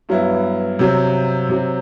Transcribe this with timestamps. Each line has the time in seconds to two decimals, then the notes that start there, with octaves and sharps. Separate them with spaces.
0.09 G2 F#3 B3 E4
0.79 C3 F#3 C4
1.49 C3 F#3 C4